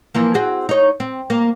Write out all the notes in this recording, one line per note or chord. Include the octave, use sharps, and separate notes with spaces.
E3 F3 A#3
C4 F#4 G#4
D#4 C#5
C4
A#3